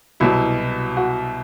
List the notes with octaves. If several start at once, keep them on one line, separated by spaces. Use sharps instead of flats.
C2 B2 F#3 E4
F#4